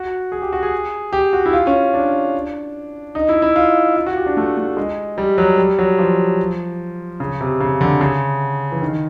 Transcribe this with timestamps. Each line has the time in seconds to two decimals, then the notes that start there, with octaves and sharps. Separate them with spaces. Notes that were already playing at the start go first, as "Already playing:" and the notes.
Already playing: F#4
0.32 G#4
0.42 G4
0.53 F#4
0.63 G#4
1.13 G4
1.33 F#4
1.46 E4
1.53 F4
1.67 C#4
1.94 D4
3.15 D#4
3.29 E4
3.42 E4
3.56 F4
3.96 F4
4.06 F#4
4.17 G4
4.26 D4
4.37 A3
4.57 A3
4.77 G#3
5.18 G3
5.38 F#3
5.58 G3
5.79 F#3
5.99 F3
7.20 C#3
7.41 C3
7.60 C#3
7.81 D3
8.01 C#3
8.72 E3
8.82 D#3